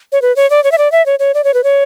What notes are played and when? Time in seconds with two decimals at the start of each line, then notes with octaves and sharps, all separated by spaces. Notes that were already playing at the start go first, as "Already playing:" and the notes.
0.12 C#5
0.22 B4
0.36 C#5
0.50 D5
0.64 C#5
0.72 E5
0.78 D5
0.92 E5
1.06 C#5
1.19 C#5
1.34 D5
1.44 C#5
1.54 B4
1.64 C#5